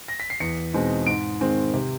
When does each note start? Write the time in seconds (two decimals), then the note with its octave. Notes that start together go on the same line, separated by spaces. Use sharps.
0.08 A#6
0.20 B6
0.30 C7
0.40 E2 C#7
0.73 B2 G#3 C4 D#4
1.06 G#2 D7
1.40 D#3 G#3 C4
1.74 C3